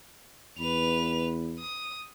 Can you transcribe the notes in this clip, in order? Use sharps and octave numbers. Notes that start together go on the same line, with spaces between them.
E2 B4 F7
D#6